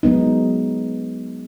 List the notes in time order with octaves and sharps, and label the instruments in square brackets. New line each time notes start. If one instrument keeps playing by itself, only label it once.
[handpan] F#3 G#3 B3 D#4